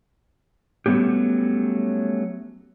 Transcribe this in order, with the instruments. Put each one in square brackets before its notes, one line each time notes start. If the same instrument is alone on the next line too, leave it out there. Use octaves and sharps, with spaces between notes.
[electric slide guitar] F#3 G3 A3 B3 C#4 G4